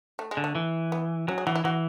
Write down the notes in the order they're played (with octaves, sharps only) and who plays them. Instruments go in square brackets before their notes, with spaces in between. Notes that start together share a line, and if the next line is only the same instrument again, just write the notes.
[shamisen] A3
G#3
[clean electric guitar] D3
[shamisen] A3
[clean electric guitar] E3
[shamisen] B3
[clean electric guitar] F#3 [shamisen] C#4
[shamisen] G#4
[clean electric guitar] E3 [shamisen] F#4
[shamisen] E4
[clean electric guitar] E3 [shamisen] F#4